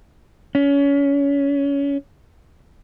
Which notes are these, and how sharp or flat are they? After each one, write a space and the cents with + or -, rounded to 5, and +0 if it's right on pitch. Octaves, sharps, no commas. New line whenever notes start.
C#4 +25